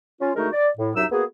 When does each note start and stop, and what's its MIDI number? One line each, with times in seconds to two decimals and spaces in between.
0.21 0.30 61
0.21 0.30 65
0.35 0.48 50
0.35 0.48 56
0.35 0.48 57
0.35 0.48 63
0.35 0.48 66
0.35 0.48 70
0.53 0.68 74
0.78 0.90 45
0.95 1.05 36
0.95 1.05 42
0.95 1.05 54
0.95 1.05 63
0.95 1.05 76
0.95 1.05 88
1.11 1.24 58
1.11 1.24 59
1.11 1.24 66
1.11 1.24 68